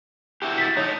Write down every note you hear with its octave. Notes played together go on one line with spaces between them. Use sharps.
E4 F#4 G4
A6 B6
A3 D#4 C#5